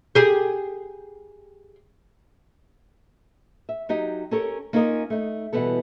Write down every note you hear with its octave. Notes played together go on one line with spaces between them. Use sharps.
G4 G#4
E5
F#3 D#4 G4 D#5
C#4 G4 A4 A#4 C#5
A#3 C#4 D#4 F4 A#4 D#5
A3 D#4
B2 E3 G3 B3 A4